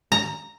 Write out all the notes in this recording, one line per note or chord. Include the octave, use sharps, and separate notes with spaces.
A#5